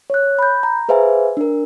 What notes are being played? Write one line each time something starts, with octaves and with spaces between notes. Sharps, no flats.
C#5 F#6
B5 G6
A#5
G#4 B4 C5 E5 F5 G#5
D4 A#4